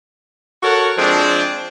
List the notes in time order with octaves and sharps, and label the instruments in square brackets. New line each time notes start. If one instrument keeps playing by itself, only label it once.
[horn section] F#4 A4 A#4 C#5 F#5
F3 G#3 C4 D4